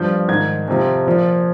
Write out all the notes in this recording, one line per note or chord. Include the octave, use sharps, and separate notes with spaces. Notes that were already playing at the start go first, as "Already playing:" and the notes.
Already playing: G2 F3 G6
G#2 D#3 G#6
F2 C3 F3
A#2 F3